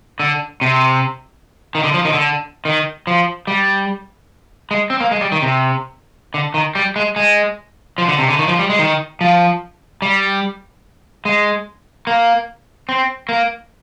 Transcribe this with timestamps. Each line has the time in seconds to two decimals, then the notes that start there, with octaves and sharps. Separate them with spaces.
0.20 D3
0.61 C3
1.75 D#3
1.84 D3
1.94 F3
2.05 D#3
2.14 D3
2.65 D#3
3.07 F3
3.47 G3
4.71 G#3
4.90 C4
5.01 A#3
5.11 G#3
5.21 G3
5.32 D#3
5.42 C3
6.34 D3
6.54 D#3
6.75 G3
6.96 G#3
7.16 G#3
7.98 F3
8.08 D3
8.19 C3
8.29 D3
8.39 D#3
8.48 F3
8.59 G3
8.70 G#3
8.79 D#3
9.21 F3
10.02 G3
11.25 G#3
12.07 A#3
12.89 C4
13.29 A#3